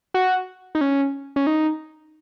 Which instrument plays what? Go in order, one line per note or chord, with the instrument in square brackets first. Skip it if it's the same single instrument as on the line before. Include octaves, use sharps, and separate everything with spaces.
[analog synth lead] F#4
D#4
C#4
C#4
D#4